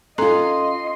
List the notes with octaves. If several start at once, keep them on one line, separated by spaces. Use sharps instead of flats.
C#4 F4 A4 D#5 A#5 C6